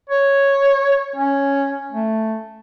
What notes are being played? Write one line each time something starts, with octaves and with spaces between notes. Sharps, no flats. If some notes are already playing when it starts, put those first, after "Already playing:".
C#5
C#4
A3